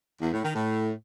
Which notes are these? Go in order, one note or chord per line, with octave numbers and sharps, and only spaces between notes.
E2
A2
D#3
A2